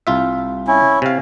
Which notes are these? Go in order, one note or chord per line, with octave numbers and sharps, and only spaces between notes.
C2 F4 E5
C#4 E4
C3 F5